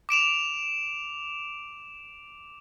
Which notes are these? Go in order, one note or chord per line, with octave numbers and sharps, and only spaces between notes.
D6 D7 E7 F7